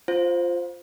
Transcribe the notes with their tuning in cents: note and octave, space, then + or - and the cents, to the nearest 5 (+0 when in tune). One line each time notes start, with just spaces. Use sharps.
F4 +0 C5 +0 F5 +40